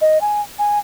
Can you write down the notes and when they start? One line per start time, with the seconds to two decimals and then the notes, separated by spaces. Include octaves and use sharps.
0.01 D#5
0.21 G#5
0.59 G#5